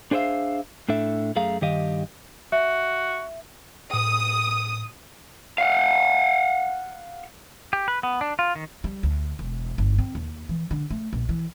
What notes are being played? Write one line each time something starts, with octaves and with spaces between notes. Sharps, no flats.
D4 G#4 C5 D5 E5 F5
A2 D4 A4 E5
F#2 A3 G#4 F5 A#5
G2 D#3 G4 D#5 F5
F#4 E5
A2 D#6
F5 F#5
G4
B4
B3
D4
F4
D#3
G3
D2
E1
G1
C4
D#2
E3
D3
A3
A#1
E3